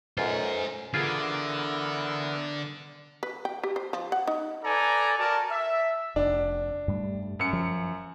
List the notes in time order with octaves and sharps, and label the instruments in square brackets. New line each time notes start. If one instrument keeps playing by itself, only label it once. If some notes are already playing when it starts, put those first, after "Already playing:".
[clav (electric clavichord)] B1 F#2 F4 [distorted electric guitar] C5 G#5
[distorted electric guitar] D3 [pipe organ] E3 B3 A#4 [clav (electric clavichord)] F4 G#4
[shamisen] B4
G5
G4
C5
F3
F#5
D#4
[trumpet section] A4 B4 D5 G#5 A#5
F#4 A#4 D5 A5
E5
[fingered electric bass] F1 [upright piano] D4
[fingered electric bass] G2 G3 A3
[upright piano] F#2 C#7
[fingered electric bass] F3